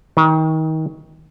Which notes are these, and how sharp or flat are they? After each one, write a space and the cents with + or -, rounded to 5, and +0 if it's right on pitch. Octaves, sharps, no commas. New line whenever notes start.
D#3 +30